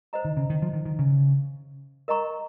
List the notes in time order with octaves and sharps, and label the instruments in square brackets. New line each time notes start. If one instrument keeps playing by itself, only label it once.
[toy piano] C5 D#5 A#5
[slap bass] D#3
C#3
D#3
F3
D#3
D#3
C#3
[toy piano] A#4 D#5 A#5 C#6